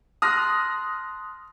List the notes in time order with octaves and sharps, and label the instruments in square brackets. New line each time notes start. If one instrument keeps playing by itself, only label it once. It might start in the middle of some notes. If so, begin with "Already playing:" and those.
[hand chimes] A5 C6 F#6 [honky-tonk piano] D#6 F6 A#6